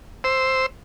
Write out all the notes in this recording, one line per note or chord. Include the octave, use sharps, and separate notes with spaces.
C5 E6